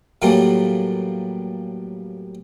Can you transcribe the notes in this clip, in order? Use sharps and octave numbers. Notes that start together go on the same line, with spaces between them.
A2 E3 F#3 G3 A3 A#3